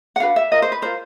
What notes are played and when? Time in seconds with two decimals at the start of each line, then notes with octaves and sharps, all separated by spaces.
0.16 F#5
0.20 D4 F#4 B4 F5
0.36 E5
0.52 F4 A#4 D#5
0.62 C5
0.72 B4
0.82 F4 A#4 C5